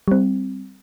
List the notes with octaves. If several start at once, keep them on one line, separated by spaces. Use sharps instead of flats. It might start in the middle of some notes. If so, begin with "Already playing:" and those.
G3 C4